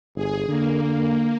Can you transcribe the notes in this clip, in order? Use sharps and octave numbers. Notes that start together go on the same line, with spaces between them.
G1 G#4
D3 A#3